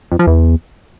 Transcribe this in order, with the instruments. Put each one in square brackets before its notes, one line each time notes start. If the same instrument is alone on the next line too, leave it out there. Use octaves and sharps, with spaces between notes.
[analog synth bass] F2
F3
E2